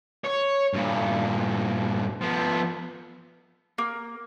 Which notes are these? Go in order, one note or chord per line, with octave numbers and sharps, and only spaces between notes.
C#5
G2 A#2
F3 B3
A#3